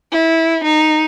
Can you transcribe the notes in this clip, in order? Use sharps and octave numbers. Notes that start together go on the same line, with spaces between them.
E4
D#4